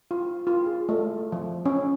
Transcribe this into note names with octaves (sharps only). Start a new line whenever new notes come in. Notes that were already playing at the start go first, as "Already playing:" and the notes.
F4
F4
G#4
A3
F3
C#4